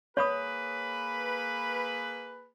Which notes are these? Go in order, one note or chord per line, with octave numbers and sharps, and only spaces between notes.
A#3 G#4 B4 C#5 B5 D#6